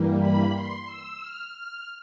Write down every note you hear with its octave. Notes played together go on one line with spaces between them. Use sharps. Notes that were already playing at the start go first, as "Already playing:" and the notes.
Already playing: G2 E3 G3 A#3
B5
C6
E6
F6
F6